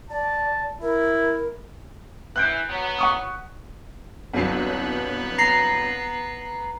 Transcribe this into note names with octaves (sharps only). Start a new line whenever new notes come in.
D5 A5
E4 A#4
E3 F#6 G6 D7
F#3 B3
F#5 C#6 D#6
G1 C2 F#3 B3 B4
A#5 C7